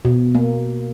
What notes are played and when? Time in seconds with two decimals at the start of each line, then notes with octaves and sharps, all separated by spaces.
0.05 B2
0.35 A#3